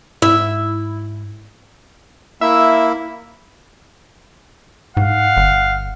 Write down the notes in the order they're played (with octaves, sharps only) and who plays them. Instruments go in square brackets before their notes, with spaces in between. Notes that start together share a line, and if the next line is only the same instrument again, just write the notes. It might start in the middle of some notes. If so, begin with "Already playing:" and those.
[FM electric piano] G#2 [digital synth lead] E4 [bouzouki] E5
[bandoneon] A#3 E4 [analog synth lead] E5
[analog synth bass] G#2 [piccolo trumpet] F5 [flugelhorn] F#5
[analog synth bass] G1